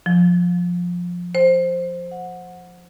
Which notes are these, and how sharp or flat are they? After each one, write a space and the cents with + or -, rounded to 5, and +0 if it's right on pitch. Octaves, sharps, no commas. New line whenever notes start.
F3 +15
C5 +5
F#5 -20